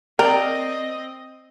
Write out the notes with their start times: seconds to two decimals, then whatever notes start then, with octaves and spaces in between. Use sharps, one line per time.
0.19 C4 A#4 D5 D#5 G5